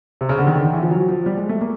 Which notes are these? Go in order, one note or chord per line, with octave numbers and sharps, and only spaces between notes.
C3
C#3
D3
D#3
D3
D#3
E3
F3
F#3
F3
G3
G#3
A3
A#3